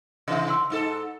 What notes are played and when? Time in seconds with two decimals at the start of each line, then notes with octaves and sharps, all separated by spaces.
0.28 C3 E3 D#5 E5
0.48 F#5 C6 E6
0.70 G#2 D#4 A4